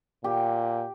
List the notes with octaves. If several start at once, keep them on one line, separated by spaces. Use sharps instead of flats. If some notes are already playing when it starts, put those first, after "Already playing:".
A#2 G4